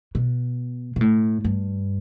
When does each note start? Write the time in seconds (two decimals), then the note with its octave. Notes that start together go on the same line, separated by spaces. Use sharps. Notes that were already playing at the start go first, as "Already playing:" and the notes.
0.15 B2
0.96 B2
1.01 A2
1.44 G2